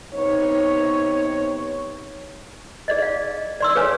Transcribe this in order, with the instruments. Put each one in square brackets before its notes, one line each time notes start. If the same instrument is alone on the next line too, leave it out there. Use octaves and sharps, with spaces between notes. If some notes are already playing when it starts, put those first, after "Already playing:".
[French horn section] C3 B3 D#4 C#5
[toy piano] G#4 D5 D#5
F5
D5 C6 E6
G#4 B4 C#5 F5 G#5